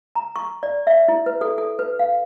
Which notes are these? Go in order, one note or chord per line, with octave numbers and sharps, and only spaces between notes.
A#5
C#6
D5
E5
E4
B4
A4
A4
B4
F5